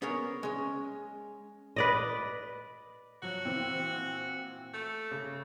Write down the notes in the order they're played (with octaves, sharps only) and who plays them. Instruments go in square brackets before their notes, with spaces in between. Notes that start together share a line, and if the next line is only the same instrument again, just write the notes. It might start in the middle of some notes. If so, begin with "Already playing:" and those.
[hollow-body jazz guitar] B3 C#4 G#4 A#4 C#5
G#3 C#4
[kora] B4 D5 D#5
[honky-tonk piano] F3 F#3 [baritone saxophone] F#4
[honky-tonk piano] A#2 E3 C4
[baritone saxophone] A3
[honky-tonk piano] C#3